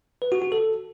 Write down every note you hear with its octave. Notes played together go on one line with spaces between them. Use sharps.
B4
F#4
F#4
A4